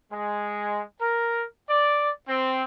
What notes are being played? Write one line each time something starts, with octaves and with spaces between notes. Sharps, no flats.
G#3
A#4
D5
C4